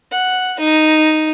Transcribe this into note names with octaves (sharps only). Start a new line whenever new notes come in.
F#5
D#4